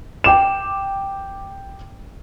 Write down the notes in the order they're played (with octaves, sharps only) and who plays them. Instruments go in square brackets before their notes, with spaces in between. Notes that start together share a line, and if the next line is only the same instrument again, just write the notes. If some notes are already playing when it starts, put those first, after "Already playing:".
[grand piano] G5 D6 E7